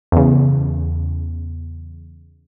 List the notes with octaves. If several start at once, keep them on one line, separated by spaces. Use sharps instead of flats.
E2 C#3